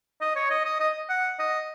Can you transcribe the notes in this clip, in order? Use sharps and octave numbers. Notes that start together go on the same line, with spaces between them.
D#5
C#5
D#5
D#5
D#5
F#5
D#5